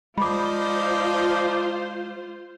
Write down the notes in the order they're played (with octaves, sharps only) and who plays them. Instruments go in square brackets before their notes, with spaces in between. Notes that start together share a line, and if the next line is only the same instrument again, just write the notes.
[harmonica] F3 D#4 D5 [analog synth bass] G#3 [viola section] F4 C5 [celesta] B5 D6